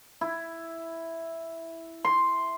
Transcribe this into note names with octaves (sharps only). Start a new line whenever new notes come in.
E4
C6